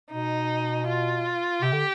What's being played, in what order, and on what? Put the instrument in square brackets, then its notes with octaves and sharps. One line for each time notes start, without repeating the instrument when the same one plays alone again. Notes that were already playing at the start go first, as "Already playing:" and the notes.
[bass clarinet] B2 [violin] D#4
[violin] F4
[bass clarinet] C3 [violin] G4
[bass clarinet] D3